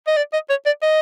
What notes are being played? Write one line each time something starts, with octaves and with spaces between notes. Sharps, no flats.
D#5
D5
D#5
C#5
D5
D#5